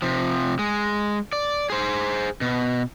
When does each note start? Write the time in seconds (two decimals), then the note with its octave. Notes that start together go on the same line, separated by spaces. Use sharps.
0.02 C3 F3
0.59 G#3
1.33 D5
1.70 G#4 C5
2.41 B2